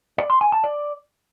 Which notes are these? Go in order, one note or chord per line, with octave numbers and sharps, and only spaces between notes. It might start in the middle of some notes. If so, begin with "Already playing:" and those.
D5
C6
G#5
A5
D5